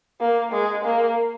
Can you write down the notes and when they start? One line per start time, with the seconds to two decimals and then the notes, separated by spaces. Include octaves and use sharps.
0.20 A#3
0.52 G#3
0.85 A#3